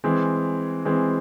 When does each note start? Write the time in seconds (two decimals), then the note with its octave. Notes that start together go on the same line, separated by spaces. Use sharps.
0.04 E3 G#3 C4
0.85 E3 G#3 C4